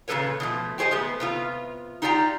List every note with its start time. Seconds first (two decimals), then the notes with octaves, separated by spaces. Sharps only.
0.08 A#2 C#3 G3 A4 B4 C#5
0.40 B2 F3 A3
0.78 G4 G#4 C5 C#5 D#5
0.91 G#3 A3 B3
1.20 C3 B3 F4
2.02 D#4 F4 G4 D5 F#5 A#5